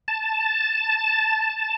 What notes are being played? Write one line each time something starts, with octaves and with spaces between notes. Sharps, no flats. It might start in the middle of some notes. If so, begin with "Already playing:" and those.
A5